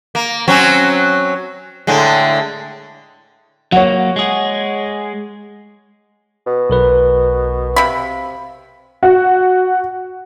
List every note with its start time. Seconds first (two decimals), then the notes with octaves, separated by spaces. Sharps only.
0.15 A#3
0.48 F#3 C4 C#4
1.87 A2 D3 G#3
3.72 F#3 A#3 C#5 F#5
4.16 G#3 G#4
6.46 B2
6.70 B1 A#4 B4
7.76 C3 F5 B5
9.03 F#4